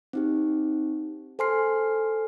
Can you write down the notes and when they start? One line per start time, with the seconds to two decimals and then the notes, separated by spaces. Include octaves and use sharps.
0.13 C4 D#4 G4
1.39 A4 C5 G#5 C6 F6 C7